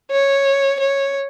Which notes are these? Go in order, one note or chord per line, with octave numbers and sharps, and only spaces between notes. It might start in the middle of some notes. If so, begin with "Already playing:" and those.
C#5
C#5